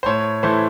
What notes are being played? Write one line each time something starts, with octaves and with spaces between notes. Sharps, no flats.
C5
A2 C#5
E3 A3 C5